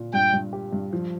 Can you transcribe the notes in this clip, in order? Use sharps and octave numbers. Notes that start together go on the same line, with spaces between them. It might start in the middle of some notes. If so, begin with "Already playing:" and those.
Already playing: A#2
G2 G5
G2
G4
G2
F3